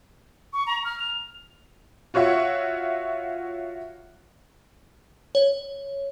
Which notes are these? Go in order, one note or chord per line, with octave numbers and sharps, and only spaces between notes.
C#6
A#5
F6
F7
F4 F#4 C#5 E5 F#5
C#5